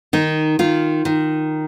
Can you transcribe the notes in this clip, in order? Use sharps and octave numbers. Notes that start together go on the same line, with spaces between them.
D#3 D#4
D#3 F4
D#3